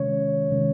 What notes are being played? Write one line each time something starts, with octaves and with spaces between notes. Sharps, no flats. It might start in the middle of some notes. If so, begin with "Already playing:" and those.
Already playing: C3 D#3 G#3 C#4 C#5
C3 D#3 G#3 C#4